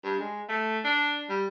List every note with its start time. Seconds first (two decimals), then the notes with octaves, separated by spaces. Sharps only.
0.04 G2
0.20 G#3
0.49 A3
0.84 D4
1.29 G3